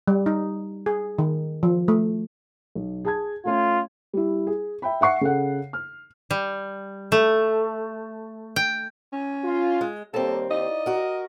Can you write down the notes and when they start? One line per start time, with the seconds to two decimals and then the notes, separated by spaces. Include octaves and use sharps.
0.07 G3
0.26 D#4
0.86 G#4
1.19 D#3
1.63 F3
1.88 A3
2.75 B1
3.05 G#4 A5 G#6
3.45 A3 C#4 F4
4.13 G3 E4
4.47 G#4
4.82 E5 G5 B5
5.01 E5 F#5 C#6 C7
5.21 C#3 A4 F#5
5.73 F6
6.31 G3
7.12 A3
8.56 G5
9.13 C#4
9.44 F4
9.81 G#3
10.14 D#2 G3 A#3 C4 A4
10.50 D#4 E4 D5 D#5
10.86 F#4 A#4